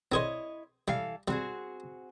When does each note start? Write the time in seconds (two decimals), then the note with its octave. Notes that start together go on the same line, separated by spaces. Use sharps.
0.12 C4 E4 G#4 C5 C#5 D#5
0.88 E3 G3 A4 F5
1.28 G3 C4 F#4 G#4